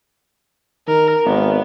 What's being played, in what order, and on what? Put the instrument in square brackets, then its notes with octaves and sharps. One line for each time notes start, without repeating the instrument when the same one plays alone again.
[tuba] D#3 [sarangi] A#4
[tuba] G#1 [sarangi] B3